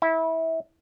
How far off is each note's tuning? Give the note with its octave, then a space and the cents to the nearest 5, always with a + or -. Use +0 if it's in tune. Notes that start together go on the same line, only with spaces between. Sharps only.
E4 -20